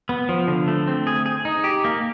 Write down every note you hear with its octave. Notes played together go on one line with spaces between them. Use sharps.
B3
F3
D3
A3
C4
G#4
G#4
D#4
G4
A#3